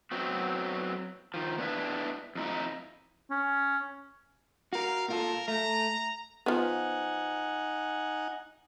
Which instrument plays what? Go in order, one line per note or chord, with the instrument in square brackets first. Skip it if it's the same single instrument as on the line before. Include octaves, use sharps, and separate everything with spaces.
[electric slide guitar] F#3 B3 C4 F#4
D#3 F3
B3 D4 E4 B4
F2 D#4 E4
[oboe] C#4
[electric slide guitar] F#4 A#4 [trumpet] F5
[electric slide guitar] A#2 F4 A4 [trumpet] A#4
[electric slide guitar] A3 [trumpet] A#5
[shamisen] F3 B3 [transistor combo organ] D#4 F#5 G#5